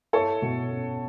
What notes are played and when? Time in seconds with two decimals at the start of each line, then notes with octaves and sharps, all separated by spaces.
0.13 E4 A4 C#5
0.42 B2
0.71 C#4